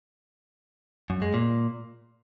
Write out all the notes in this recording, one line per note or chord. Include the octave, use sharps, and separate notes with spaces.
F#2
G#3
A#2